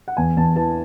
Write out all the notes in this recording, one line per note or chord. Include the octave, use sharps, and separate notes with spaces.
F#5
E2 G#5
E2 A5
E3 A5